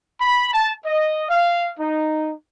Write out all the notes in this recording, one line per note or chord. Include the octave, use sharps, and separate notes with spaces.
B5
A5
D#5
F5
D#4